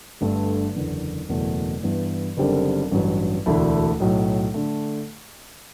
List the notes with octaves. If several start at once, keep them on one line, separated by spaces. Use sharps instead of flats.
G1 G2 D3 A3
F#1 E2 D3
F#1 E2 B2 A3
G2 E3 B3
F#1 F#2 D3 G3 C4
A1 G2 F#3
E1 D2 D3 A3 E4
B1 A2 F#3
D3 A3